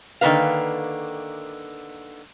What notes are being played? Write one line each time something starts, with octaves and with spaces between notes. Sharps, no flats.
D3 D#3 F3 A#3 B4 F5